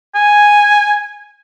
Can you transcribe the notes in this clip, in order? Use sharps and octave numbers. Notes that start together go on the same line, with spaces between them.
G#5